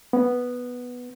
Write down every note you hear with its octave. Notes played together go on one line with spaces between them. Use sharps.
B3